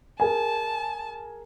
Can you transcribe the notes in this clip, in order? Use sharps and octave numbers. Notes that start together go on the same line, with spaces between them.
G#4 A#4 G#5 A5